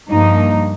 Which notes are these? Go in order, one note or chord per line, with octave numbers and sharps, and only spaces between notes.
G2 F3 A#3 D#4